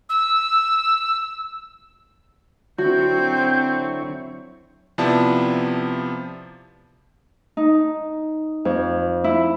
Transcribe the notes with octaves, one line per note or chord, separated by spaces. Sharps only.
E6
D3 F#3 C4 E4 F#4 C#5 G6
C3 F3 B3 E4 D5 A5
D#4
F2
E4